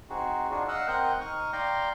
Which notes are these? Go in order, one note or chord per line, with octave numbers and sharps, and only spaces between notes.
C4 D#4 F#4 G#4
D4 D#4 F4 F#4 G#4
D#5 F5 F#5 E6
C4 A#4 D#5 F#5 G5
D#4 C#6 D#6 F6
D5 F5 G5 A#5 C6